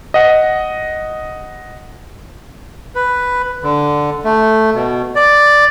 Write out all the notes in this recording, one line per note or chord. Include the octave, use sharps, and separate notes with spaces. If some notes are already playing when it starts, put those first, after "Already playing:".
D#5 F#5
B4
D3
A3
B2
D5